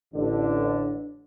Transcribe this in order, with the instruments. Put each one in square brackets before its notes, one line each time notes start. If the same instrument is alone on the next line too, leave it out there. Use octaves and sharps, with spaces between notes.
[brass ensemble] A1 D3 D4